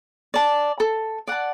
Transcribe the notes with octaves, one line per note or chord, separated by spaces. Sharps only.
D5 A5
A4
D5 F#5 A5